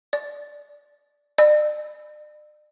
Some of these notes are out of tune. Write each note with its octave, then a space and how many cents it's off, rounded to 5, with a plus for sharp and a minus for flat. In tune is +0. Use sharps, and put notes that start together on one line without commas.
D5 -5
D5 +40